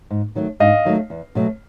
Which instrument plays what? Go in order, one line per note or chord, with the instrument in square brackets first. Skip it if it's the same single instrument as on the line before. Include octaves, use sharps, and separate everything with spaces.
[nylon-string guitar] G#2
D#3 F#3 A3
[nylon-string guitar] G#2 [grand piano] D#5 F5
[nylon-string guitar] D#3 F#3 A3
E2
B2 F#3 A3